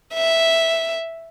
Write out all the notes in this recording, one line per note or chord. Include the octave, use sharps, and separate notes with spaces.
E5